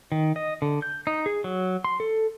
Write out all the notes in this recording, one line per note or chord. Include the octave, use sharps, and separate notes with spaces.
D#3
D#5
D3
G6
D#4
G#4
F#3
C6
A4